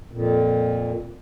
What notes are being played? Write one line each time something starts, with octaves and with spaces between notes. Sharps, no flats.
F2 A#2